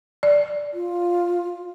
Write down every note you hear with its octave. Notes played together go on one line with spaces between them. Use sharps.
D5
F4